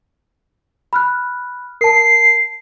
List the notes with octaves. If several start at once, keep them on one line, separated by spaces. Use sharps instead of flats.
B5 F6 F#6
A#4 A5 C7